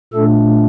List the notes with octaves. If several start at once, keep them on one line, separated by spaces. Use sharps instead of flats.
A#2 A3 D4 A4